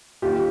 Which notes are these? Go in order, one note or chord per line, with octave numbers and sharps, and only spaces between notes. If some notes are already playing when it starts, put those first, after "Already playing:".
D#2 D#3 F4 G4